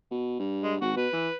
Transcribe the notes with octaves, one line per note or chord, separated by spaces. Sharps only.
B2
G2
G#3
G#1 F#4
B2 B4
E3